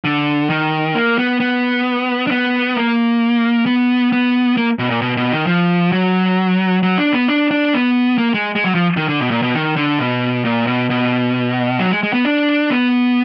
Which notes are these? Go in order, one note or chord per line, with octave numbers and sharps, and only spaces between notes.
D3
D#3
A#3
B3
B3
D4
B3
A#3
B3
B3
A#3
B2
A#2
B2
B2
D#3
F3
F#3
F#3
D4
B3
D4
D4
B3
A#3
G#3
G#3
F#3
F3
D#3
D3
B2
A#2
B2
D#3
D3
B2
A#2
B2
B2
F#3
G#3
G#3
B3
D4
B3